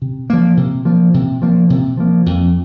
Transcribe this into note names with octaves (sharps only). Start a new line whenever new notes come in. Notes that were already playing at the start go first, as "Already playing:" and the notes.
C3
F3 A#3
C3
F3 A#3
C3
F3 A#3
C3
F3 A#3
F2